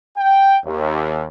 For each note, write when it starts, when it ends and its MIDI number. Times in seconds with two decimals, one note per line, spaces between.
0.17 0.57 79
0.65 1.27 39